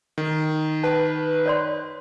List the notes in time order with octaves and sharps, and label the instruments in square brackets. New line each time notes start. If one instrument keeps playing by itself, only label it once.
[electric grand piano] D#3
[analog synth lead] B4 [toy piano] A5
[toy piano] C#5 D5 C6